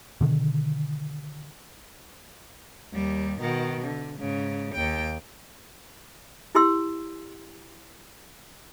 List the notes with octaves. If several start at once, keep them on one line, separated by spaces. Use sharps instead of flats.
B2 D3 D#3
D#2 G3
B2 D#3
D3
G#2 C#3
D#2 G5
E4 G4 C6 E6